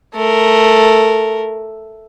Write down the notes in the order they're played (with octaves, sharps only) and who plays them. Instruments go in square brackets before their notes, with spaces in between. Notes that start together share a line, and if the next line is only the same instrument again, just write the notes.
[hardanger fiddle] A3 A#4